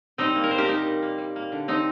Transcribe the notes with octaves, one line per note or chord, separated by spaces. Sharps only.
G3 C4 D#4
A#3
A#4
A#2 C5
G4 A#4
A#2 D#4 G4
G3
A#3
G3
A#3
D3
D3 C4 D#4